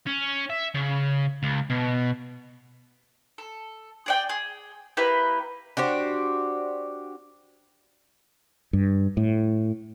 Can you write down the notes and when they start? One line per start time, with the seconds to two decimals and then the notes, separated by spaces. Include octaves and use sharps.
0.07 C#4
0.50 E5
0.75 C#3
1.43 C#2
1.70 B2
3.38 A4
4.06 G#4 D5 G5
4.29 G#4
4.97 A#3 E4 G4 B4
5.77 D4 F#4 G4 C5
8.73 G2
9.17 A2